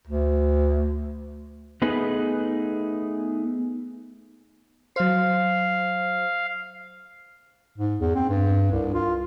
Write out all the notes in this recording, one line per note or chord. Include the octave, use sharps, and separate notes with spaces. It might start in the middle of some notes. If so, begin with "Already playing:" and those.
D2
A3 B3 D#4 G#4 B4
F#3 C5 F5
G#2
E2
C4
G2
C2
F4